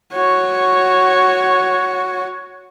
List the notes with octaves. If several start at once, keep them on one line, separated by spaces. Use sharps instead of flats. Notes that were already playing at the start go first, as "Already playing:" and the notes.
F#4 C#5